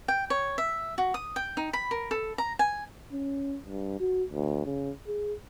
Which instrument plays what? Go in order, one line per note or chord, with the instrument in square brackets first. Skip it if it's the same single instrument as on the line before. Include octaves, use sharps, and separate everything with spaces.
[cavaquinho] G5
C#5
E5
F#4
D#6
G5
D#4
B5
A#4
A4
A#5
G#5
[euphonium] C#4
G2
F#4
D2
C#3
G#4